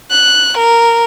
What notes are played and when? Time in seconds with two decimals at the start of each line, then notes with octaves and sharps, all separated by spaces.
0.11 F#6
0.58 A#4